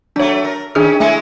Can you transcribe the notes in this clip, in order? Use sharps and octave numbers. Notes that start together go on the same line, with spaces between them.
F#3 A3 D4 C#5
A#4
D#3 C#4 D4 G#4 F6
F#3 G#3 A3 E4 G#5 C#7